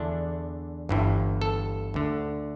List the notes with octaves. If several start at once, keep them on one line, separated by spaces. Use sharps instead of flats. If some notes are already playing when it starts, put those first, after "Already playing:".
Already playing: E2 D3 D4
G1 G2 E3
A4
D2 D3